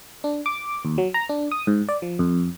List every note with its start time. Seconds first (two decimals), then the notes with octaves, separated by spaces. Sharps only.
0.24 D4
0.46 D6
0.85 D#2
0.98 F#3
1.14 A#5
1.29 D4
1.51 D#6
1.67 G#2
1.89 D5
2.02 F3
2.19 F2